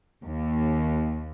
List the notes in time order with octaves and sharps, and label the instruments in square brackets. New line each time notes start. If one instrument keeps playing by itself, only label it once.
[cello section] D#2